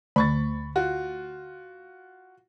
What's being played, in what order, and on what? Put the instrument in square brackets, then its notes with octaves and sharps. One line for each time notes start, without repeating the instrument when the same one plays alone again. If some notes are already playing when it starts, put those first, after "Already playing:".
[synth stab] D2 [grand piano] B5 C#6 A6
[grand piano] F4 F#4